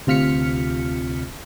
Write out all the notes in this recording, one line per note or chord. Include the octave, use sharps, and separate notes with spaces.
D2 C3 F4 F6 B6 C#7